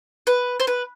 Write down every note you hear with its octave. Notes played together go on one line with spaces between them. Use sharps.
B4
C5
B4